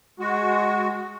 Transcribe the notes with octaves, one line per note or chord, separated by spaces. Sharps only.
G#3 F#4